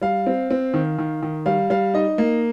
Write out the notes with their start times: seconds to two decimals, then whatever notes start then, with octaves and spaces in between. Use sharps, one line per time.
0.02 G3 F5
0.26 C4
0.51 C4
0.74 D#3
0.98 D#3
1.22 D#3
1.46 G3 F5
1.70 G3 F5
1.94 D#4 D#5
2.18 A#3